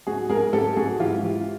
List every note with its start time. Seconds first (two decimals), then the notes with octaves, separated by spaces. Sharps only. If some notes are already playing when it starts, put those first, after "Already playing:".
0.07 G#2 F#4 G#4
0.30 G#2 G#4 A#4
0.53 G#2 G4 A4
0.76 G#2 F#4 G#4
1.00 E3 F4 G4
1.23 E3